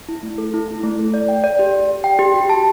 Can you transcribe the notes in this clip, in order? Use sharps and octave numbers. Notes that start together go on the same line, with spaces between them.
E4
A3
A4
E4
E4
A3
A4
D5
G5
D5
G4
G4
D5
G5
G4
F#4
A5